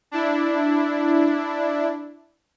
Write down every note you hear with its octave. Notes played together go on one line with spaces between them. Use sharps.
D4 E4